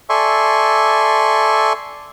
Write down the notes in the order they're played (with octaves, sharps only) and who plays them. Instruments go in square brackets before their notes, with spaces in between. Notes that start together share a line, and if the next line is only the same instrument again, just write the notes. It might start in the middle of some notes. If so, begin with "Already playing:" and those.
[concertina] A4 D5 E5 G#5 C6 C#6